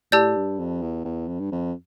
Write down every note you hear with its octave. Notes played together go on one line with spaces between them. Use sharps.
A2 G4 D5 A5 E6 G6
G2
F2
E2
E2
F2
G2
F2